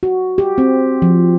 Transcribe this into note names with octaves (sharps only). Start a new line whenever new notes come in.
F#4
G4
C4
F3